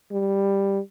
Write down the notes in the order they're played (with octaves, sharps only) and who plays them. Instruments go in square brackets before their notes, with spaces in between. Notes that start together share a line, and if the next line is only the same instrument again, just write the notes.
[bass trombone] G3